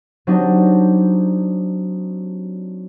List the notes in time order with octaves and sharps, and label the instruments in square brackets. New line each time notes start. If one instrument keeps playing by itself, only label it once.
[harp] F#3 C4 D4 D#4 G4